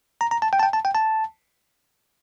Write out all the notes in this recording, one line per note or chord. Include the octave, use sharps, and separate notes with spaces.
A#5
A#5
A5
G5
A5
G5
A5
G5
A5